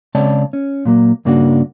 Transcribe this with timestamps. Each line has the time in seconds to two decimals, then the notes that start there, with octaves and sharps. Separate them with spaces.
0.15 C#3 G#3 C4 C#5 D5 A5
0.53 C#4
0.85 A#2 F#3 A#3
1.25 G2 C#3 A#3 D4 F4 F#4